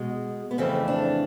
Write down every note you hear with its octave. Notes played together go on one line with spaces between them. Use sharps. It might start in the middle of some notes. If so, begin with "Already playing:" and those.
Already playing: B2 G#3
B3
F2 C#3 E3 A3 C4
D4